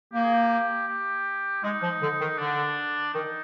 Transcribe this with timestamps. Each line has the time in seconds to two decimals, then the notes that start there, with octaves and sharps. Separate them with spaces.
0.12 A#3 G4
0.23 G#4
0.32 G4
0.87 G4
1.63 G#3 D#4
1.82 F3
2.01 D3
2.20 D#3
2.38 D3 D4
3.14 D#3 D#4